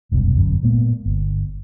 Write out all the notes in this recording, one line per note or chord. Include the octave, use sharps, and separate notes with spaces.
F1 C2 F#2 B2
G1 F#2
A#2 G#3 A#3 B3
G1